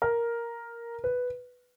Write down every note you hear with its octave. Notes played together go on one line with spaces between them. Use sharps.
A#4
B4